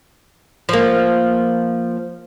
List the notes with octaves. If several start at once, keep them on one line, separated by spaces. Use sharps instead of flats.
F3 A#3